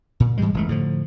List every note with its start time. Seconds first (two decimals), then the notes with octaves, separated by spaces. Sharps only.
0.20 A#2
0.38 G#2 E3 G3 G#3
0.54 F1 E3 G#3 A3
0.69 A2 D3 F3